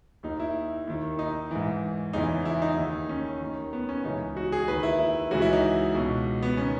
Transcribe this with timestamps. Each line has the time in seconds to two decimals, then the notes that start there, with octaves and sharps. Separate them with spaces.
0.23 D#2 D#3 D#4
0.40 E4
0.87 D#2 D#3
1.19 D#4
1.51 G#2 E3
2.13 E2 C#3 E3 D#4
2.45 E4
2.62 D#4
2.78 D#2 D#3
3.09 C#4
3.41 D#2 D#3
3.73 B3
3.89 C#4
4.04 C#2 C#3 E3 D#4
4.37 F#4
4.52 G#4
4.68 D#2 D#3 B4
4.83 E4
5.00 E4
5.31 C#2 C#3 E3 F#4
5.42 E4
5.53 D#4
5.94 C#2 B2
6.43 B3
6.57 D#3 C#4